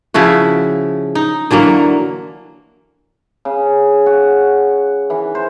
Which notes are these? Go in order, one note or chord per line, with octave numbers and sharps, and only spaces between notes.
C#3 F3 E4 F#4
D#4
D3 E3 F#3 A#3
C#3
F#4
E3
C5